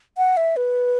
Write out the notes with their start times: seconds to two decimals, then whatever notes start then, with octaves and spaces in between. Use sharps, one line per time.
0.18 F#5
0.37 E5
0.57 B4